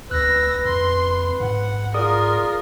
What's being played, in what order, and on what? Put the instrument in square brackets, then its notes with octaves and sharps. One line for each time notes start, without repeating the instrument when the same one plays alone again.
[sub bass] D2 [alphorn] B4 [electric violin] E6 A#6 [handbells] F#6
[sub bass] F2 [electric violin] C6
[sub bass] G#2 [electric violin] F#5
[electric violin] F4 A#4 [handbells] G#4 D5 D#6